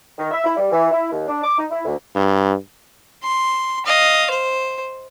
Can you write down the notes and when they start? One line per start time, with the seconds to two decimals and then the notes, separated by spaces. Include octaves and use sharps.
0.19 D#3
0.31 E5
0.44 E4
0.57 G3
0.72 E3
0.91 E4
1.11 D#2
1.28 D4
1.44 D6
1.58 D#4
1.70 E4
1.85 D2
2.15 G2
3.23 C6
3.86 D#5 F5
4.30 C5